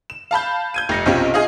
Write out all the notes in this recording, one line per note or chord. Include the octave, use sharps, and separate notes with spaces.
E7
F5 A5 B5 G6
G6 G#6 D#7
F1 A#6 C#7
B1 C3 C#4 F4 G4
F4 G#4 D#5 F5